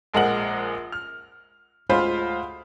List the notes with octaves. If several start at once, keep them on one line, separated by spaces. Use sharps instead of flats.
A#1 G#3 A#4 F#5 F#7
F6
D2 G#3 F4 C5 F5 B5